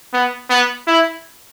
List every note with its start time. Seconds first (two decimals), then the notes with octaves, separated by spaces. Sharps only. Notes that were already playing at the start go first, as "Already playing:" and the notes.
0.14 B3
0.50 B3
0.87 E4